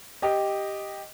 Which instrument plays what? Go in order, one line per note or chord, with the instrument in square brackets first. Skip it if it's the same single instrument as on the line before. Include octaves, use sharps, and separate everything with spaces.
[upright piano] G4 D#5